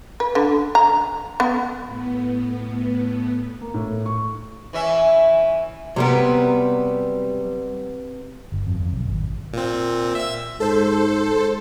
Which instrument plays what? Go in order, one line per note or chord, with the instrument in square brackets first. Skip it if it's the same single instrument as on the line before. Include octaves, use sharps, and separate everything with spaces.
[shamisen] B4
D3
A#5
B3
[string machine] A2 B3
[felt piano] A#3
A2
C#6
[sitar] E3 C#4 E5
[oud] C3 B3 [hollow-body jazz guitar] F#3 G3 A#4
[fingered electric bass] G1
F2
F2
B1
G#1
[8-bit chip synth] A#2 C4
E5 E6
[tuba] G#2 [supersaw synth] A4 C5